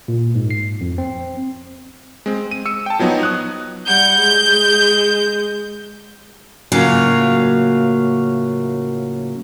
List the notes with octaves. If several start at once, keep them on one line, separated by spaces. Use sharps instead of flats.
A#2
G#2
C7
F2
C4
G#3 C4
D#7
E6 C#7
G5 A5
F3 F#3 B3 D#4 F#4
D#6 F#6
G3 F#5 G6
G#3
A2 C#3 F#3 A#3 F4